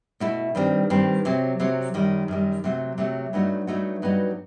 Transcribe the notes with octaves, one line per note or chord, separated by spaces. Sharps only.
B2 A3 E4
G2 D#3 G3 C4
G2 D#3 G3 C4
C3 F#3 C4
C3 F#3 C4
F#2 D#3 G3
F#2 D#3 G3
C3 F#3 A3
C3 F#3 A3
G2 F#3 A3 D#4 F#4
G2 F#3 A3 D#4 F#4
G2 F#3 B3 D#4 F#4